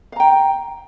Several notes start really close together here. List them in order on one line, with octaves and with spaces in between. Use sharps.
F5 A#5 G5